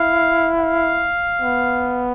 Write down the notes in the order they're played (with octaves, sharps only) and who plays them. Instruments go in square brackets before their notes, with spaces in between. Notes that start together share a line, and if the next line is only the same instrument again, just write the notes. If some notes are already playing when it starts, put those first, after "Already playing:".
Already playing: [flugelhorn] E4 [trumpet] F5
[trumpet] F5
[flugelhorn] B3